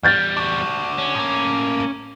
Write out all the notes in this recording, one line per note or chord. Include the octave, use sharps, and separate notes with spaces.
E2 G3 F6 G6 A6
D4 F#4
C#4
A2 A#3